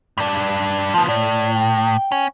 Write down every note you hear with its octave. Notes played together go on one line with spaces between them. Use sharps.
G2 D4
F3 B3 A5
A2 D5
G5
C#4